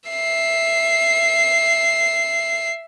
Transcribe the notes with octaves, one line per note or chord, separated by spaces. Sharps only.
E5 C7